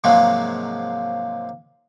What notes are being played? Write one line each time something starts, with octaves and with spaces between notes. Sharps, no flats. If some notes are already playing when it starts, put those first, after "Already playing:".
G#2 C3 F3 F#3 G#3 A#3